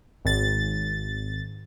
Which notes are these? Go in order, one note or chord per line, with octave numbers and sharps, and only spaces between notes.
G#1 A6